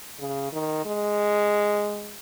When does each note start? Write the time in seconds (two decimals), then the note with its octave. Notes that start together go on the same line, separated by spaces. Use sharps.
0.20 C#3
0.52 D#3
0.85 G#3